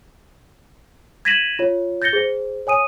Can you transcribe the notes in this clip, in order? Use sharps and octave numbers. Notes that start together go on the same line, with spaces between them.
G#6 A#6 B6 D#7 E7 F#7
F4 C#5
G6 A6 A#6 C#7 G7
G#4 C5
C#5 G#5 D#6 D#7